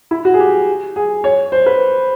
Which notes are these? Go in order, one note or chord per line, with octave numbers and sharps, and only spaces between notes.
E4
F#4
G#4
G4
G#4
C#5
C5
B4